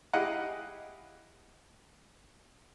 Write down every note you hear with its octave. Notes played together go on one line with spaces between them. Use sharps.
E4 G4 G#4 D#5 F5 F#5